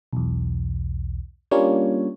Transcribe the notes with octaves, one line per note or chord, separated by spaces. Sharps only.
B1 E2
G3 A#3 C#4 D4 F4 C#5